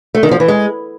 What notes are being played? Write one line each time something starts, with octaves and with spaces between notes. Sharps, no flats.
A3
D#3
F3
E3
G#3